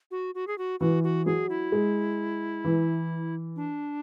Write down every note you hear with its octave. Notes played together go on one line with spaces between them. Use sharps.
F#4
F#4
G#4
F#4
E3 F#4
F#4
F#3 G#4
E4
G#3
E3
D4